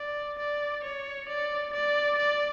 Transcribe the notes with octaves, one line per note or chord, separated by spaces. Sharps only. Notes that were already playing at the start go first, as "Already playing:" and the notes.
Already playing: D5
D5
C#5
D5
D5
D5